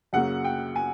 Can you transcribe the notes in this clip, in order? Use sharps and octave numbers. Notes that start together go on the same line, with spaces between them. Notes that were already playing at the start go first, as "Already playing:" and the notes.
F#2 C#3 F#3 A#3 F#5
G5
G#5